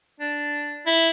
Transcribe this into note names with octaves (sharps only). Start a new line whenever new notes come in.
D4
E4